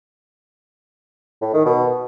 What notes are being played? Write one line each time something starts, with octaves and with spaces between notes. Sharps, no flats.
A2
D#3
B2